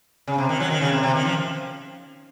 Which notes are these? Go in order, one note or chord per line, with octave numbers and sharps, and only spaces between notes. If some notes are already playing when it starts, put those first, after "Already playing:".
C#3
C3
D#3
F#3
D#3
C#3
C3
C3
D#3
F3